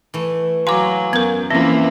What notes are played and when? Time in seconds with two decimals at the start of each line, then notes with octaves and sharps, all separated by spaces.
0.14 E3 A3
0.67 F#3 F5 G#5 A#5 C6 D6
1.13 F#2 B3 A#4
1.51 E3 F3 A#3 C4 C#4 E5